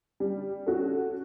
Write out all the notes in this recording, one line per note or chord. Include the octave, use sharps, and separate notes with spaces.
G3
C#4 F#4 A4